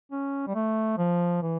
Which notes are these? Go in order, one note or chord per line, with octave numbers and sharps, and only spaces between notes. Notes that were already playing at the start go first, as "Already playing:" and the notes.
C#4
G3
A3
F3
E3